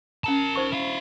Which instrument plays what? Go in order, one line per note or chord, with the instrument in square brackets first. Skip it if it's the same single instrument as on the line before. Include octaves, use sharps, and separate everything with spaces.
[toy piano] C#4 A#5 [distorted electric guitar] A#4 A5
[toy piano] D#4 C5 C#6
[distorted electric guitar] E4 F5